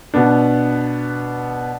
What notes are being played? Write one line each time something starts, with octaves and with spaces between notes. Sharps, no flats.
B2 B3 D4